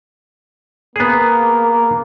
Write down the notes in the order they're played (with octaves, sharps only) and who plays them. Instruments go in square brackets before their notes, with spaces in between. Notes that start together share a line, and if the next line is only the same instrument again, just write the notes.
[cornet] A#3 [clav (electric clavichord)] B3 G#4